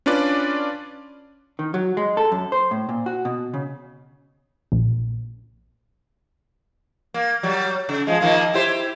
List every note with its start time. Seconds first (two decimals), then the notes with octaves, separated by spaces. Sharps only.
0.06 C#4 D4 F4 B4 D5
1.59 D#3
1.74 F#3
1.97 G#3
2.17 A4
2.32 F#2
2.52 C5
2.71 A2
2.89 A#2
3.06 F#4
3.25 B2
3.54 C#3
4.72 A#1
7.14 A#3
7.43 F#3 G3
7.89 C#3
8.07 F3 G#3
8.20 D#3 F3 A#3
8.54 E4 G4 C5